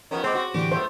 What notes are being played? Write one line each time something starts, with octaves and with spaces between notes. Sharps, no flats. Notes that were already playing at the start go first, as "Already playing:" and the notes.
D#3 F3 B3 C#4
A#2 G#3 B3 C4 C5 D6
F#4
A2 D3 E3 G4
A3 B3 C5